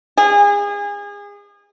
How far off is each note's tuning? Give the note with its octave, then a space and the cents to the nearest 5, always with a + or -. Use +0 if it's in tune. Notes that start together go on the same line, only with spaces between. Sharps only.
G#4 -30